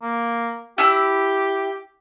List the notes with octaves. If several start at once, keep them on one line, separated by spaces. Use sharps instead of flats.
A#3
E4 G4 E6